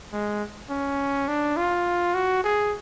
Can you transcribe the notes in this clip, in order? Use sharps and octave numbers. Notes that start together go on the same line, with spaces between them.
G#3
C#4
D4
F4
F#4
G#4